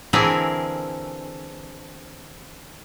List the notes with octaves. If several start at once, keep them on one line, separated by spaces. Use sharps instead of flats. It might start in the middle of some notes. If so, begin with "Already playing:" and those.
D3 E3 C4 E4 G#4 A#4